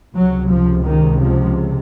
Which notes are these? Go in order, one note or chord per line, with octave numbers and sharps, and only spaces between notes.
C#2 C3 F#3
F3
D#3
F3